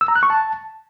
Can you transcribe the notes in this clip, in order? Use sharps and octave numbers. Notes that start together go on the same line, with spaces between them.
E6
A#5
F#6
C#6
A5